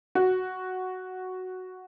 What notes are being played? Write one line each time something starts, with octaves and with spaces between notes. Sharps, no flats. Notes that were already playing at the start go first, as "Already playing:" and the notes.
F#4